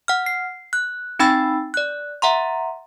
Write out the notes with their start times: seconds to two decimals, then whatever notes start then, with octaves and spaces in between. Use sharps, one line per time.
0.08 F#5 F6
0.26 C7
0.73 F#6
1.19 C4 D#4 G5 B5 E6 A6
1.74 D5 F#6
2.22 E5 F#5 A#5 C6